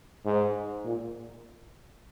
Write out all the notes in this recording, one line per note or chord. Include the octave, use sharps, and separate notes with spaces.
G#2
A#2